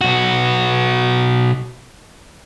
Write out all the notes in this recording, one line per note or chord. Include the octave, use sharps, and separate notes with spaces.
B1 F#4